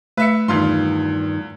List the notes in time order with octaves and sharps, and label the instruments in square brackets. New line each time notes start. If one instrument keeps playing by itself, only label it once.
[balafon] A3 [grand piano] B4 E5 C#7
[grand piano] E2 F4 C6 [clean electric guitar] G2 D#3